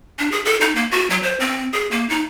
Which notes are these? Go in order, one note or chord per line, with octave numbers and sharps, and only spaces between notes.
D4
G#4
A4
D#4
A#3
F#4
F#3
C5
C4
G#4
A#3
D#4